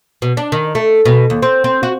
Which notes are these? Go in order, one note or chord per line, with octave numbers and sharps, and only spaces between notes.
B2
D4
D#3
A3
B2
D#2
C4
C4
F#4